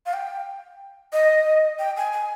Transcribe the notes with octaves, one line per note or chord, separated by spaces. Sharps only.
F5
G5
D#5
G5
G#5
G#5